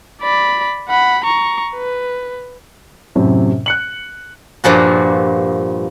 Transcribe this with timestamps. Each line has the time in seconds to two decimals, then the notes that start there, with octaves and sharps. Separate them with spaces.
0.22 D5 B5
0.89 F#5 B5
1.24 A#5 C#6
1.74 B4
3.15 F#2 A2 C3
3.66 F#6 C#7 F#7
4.64 G2 A#2 F3 F#4